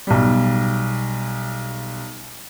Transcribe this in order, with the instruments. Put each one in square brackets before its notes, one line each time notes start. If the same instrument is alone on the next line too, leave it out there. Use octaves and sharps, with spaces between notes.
[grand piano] B1 G3